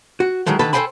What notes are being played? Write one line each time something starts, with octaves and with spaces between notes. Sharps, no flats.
F#4
D#3 E3 F#3 G#3 A3
D3 D#3 A4 B4 A5 B5
A4 A#4 C5 G5 G#5 B5